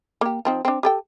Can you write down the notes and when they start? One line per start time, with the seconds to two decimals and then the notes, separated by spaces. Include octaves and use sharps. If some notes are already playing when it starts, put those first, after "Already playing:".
0.21 A#3 G4
0.45 F3 C4 D#4
0.65 C4 D4
0.83 G4 A4 G5